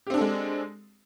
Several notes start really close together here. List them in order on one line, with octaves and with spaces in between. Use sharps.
G4 C4 D4 A4 G#3